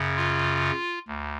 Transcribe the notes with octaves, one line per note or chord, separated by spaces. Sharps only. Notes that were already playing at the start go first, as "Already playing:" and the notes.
Already playing: F#2 C#3
F4
D2